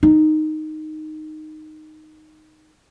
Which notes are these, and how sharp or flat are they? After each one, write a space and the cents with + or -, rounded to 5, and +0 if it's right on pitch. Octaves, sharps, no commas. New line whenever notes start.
D#4 -5